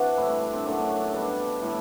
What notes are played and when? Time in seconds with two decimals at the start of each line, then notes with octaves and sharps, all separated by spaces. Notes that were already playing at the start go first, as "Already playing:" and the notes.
Already playing: E3 C4 D4 F#4
0.17 A2 G3 E4
0.30 D4
0.42 D4
0.53 C4
0.65 F#2 F#3 A3 D4
0.89 D4
1.13 B2 G3 D4
1.62 A2 G3